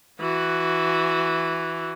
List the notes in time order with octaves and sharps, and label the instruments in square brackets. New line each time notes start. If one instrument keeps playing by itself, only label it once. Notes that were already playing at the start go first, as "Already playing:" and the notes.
[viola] E3 F#4